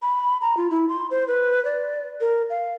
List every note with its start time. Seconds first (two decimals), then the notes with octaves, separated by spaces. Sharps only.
0.02 B5
0.41 A#5
0.57 F4
0.70 E4
0.89 C6
1.11 C5
1.28 B4
1.65 D5
2.21 A#4
2.50 F5